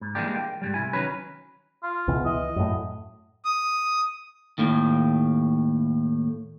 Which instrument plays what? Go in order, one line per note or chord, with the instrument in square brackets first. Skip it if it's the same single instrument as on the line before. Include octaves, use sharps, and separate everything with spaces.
[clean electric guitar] G#2
E3 G3 G#3 A#3 D4 G4
G5
G#2 C#3 G3
C2 E4 G#5
D#3 F#3 C#4 B4
[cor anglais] F4
[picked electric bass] C#2 B2 E3
[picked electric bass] E3 [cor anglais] D#5
[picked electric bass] F#2 A2
[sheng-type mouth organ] D#6
[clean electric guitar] D#2 A2 D#3